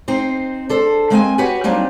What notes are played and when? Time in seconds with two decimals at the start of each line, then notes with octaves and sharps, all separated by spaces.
0.08 C4 D#4 C5
0.69 D4 A4 C5
1.10 G#3 A#3 C4 D#5 F#5 G#5
1.38 F#4 G4 B4 C#5 F#5 G#5
1.64 F#3 G3 A#3 C4 D4 D#4